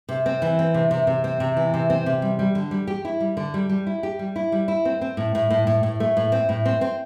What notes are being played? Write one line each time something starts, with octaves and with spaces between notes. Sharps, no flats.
C3
C4
E3
C4
C3
C3
C3
C4
C3
E3
C3
C4
C3
G3
G3
D3
G3
G4
E4
G3
D3
G3
G3
E4
G4
G3
E4
G3
E4
C4
C4
A2
A2
A2
A2
A2
A3
A2
C4
A2
C4
C4